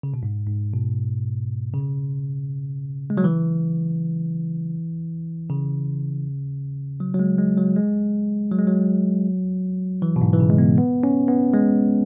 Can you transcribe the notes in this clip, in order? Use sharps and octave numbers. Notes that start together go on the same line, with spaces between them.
C#3
B2
G#2
G#2
B2
C#3
G#3
F#3
E3
C#3
F#3
F#3
G#3
G#3
F#3
G#3
F#3
G#3
F#3
E3
B2
G#2
E3
C#3
G#3
B3
B3
C#4
B3
G#3